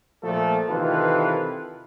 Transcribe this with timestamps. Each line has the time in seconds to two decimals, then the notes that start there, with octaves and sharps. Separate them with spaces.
0.24 A#2 F3 A3 A4
0.69 C3 D#3 E3 F4 A4 B4